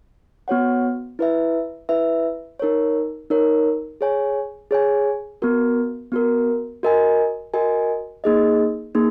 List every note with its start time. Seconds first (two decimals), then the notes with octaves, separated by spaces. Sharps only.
0.48 B3 F#4 C#5 F#5
1.19 E4 B4 E5
1.89 E4 B4 E5
2.59 D#4 A#4 C#5
3.30 D#4 A#4 C#5
4.01 G#4 C#5 G#5
4.71 G#4 C#5 G#5
5.42 B3 F#4 A#4
6.12 B3 F#4 A#4
6.83 F#4 A#4 D#5 G#5
7.54 F#4 A#4 D#5 G#5
8.24 A#3 D#4 G#4 D#5
8.95 A#3 D#4 G#4